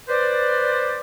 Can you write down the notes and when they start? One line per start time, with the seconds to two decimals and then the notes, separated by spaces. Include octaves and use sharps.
0.09 B4 C5 D5